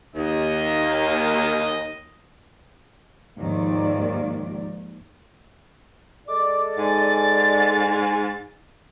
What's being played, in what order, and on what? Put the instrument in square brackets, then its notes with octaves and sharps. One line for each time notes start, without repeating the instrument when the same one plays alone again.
[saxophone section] D#2 [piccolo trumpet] D#5
[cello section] D#2 G#2 D#3 F3 D5
[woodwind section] G#3 A4 D5 [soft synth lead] D6
[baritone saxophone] G#2 [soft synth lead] G#5 [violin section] A6